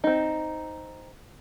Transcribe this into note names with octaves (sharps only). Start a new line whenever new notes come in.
C4 D#4